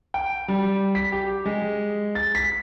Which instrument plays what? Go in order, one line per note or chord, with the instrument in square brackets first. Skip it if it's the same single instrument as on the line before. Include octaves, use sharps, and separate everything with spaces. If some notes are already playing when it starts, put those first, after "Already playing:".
[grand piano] G5
G3
B6
G4
G#3
A6
B6